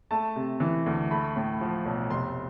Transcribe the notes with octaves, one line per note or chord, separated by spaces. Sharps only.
A3 A5
C3
E3
D2
A3 B5
A2
F3
B1
F1 C6